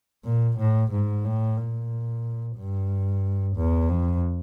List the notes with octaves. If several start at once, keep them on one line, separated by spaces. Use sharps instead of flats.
A#2
A2
G#2
A2
A#2
G2
E2
F2